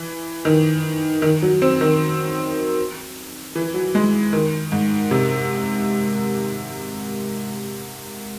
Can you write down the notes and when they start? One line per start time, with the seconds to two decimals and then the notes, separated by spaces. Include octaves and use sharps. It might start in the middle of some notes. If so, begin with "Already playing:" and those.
Already playing: E3
0.45 D#3
1.22 D#3
1.42 F#3
1.62 C4
1.81 D#3
3.55 E3
3.74 F#3
3.95 G#3
4.33 D#3
4.72 G#2
5.11 C3